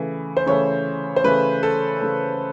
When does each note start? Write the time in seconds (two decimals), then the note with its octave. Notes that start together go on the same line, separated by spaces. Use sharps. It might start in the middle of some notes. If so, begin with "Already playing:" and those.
Already playing: C#3 E3 A3
0.37 C5
0.46 C#3 E3 A3 C#5
1.16 C5
1.24 C#3 E3 A3 B4
1.63 A4
2.01 C#3 E3 A3